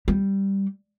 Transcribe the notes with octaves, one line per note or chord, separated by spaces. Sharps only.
G3